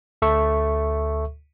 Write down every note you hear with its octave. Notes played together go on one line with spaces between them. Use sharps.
D2 A4 E5 C#6